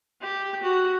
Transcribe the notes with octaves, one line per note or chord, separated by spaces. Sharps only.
G4
F#4